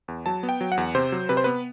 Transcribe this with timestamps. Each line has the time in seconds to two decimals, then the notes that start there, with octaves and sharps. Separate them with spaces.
0.08 E2
0.26 F#3 A5
0.43 B3
0.49 G5
0.61 F#3
0.72 F#5
0.77 E2
0.95 C3 C5
1.12 F#3
1.29 C3 B4
1.37 C5
1.44 B3 B4